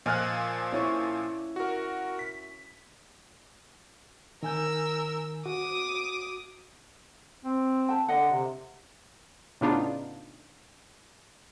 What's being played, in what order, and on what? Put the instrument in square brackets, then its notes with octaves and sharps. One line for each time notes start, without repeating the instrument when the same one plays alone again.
[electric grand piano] A#2 F3 G#5 [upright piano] D#5 F6 F#6
[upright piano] C#4 E4 C#6
[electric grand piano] F#4 A#4
B6
[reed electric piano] D#3 G#5 G6 [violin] A#4 E6
[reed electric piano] F#4 [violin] D6 D#6
[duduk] C4
[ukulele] G5 A5
[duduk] D3 [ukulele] D5 D#5 F#5
[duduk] C3
[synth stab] A2 C#3 B3 D4 D#4 F4